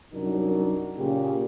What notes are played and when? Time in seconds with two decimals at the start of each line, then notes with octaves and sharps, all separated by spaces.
0.13 C2 F#2 F#3 D4 D#4 A#4
0.98 A#2 C#3 G4